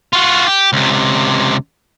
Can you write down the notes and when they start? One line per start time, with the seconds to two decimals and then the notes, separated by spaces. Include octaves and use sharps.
0.13 F4 F#4
0.47 G4
0.73 C#2 C3